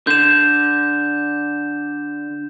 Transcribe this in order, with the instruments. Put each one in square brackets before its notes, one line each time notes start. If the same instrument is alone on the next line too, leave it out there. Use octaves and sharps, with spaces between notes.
[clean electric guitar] D3 [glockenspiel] G6 E7